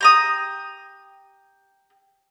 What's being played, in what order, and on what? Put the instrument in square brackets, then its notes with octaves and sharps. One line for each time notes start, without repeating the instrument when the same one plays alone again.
[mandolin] G4 A#5 D#6